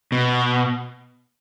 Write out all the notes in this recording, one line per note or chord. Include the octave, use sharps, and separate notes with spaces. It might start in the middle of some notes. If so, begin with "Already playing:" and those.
B2